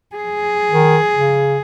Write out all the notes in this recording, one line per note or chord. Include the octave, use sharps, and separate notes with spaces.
G#4
D#3
C#3